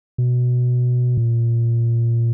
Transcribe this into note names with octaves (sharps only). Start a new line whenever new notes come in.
B2
A#2